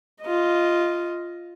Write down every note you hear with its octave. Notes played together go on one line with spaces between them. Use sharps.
F4 D#5